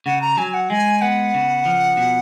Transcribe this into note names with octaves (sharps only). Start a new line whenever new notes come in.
C#3 F#5
A#5
F#3 G#5
F#5
G#3 G#5
B3 F#5
C#3
F3
B2